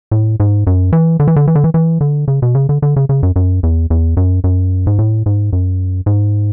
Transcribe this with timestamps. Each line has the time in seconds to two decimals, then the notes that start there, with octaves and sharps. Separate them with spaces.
0.11 A2
0.40 G#2
0.67 F#2
0.93 E3
1.20 D3
1.28 E3
1.36 D3
1.47 E3
1.55 D3
1.64 E3
1.74 E3
2.01 D3
2.28 C#3
2.42 B2
2.55 C#3
2.69 D3
2.82 D3
2.96 C#3
3.09 C#3
3.23 F#2
3.36 F#2
3.63 E2
3.90 E2
4.17 F#2
4.44 F#2
4.87 G#2
4.99 A2
5.26 G#2
5.53 F#2
6.06 G#2